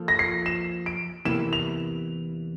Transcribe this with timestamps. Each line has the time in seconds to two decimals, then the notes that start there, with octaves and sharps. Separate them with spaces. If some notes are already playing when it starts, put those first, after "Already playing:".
Already playing: F3 A#3 F4 A4
0.08 A#6
0.19 C7
0.46 E7
0.86 D7
1.25 E2 C3 E3 A#3 E4 E7
1.53 F7